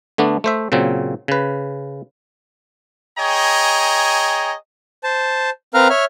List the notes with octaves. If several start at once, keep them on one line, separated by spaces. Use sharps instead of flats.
D3 A3 B3 D4
A3 C5 E5
A#2 C#3 F#3 C4
C#3 B4
G#4 C#5 D#5 G5 G#5 A#5
C5 A5
C4 A#4 B4 F5 A#5 F6
C#5 E5 F6